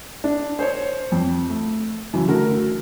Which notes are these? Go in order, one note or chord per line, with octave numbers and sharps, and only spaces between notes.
D4
C5 C#5
F2
A3
F#2 C#3 E3
D3 A3 F#4 A#4